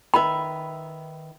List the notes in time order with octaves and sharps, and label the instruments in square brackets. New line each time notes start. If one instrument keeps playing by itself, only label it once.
[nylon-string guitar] D#3 B4 E5 [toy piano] B5